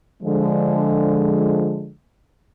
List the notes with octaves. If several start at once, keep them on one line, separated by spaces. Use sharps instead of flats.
D3 F3 G#3